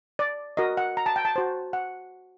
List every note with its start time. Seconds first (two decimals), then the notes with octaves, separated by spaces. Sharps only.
0.19 D5
0.57 F#4 A#4 D#5
0.77 F#5
0.97 A#5
1.06 A5
1.16 G5
1.25 A5
1.36 F#4 C5
1.73 F#5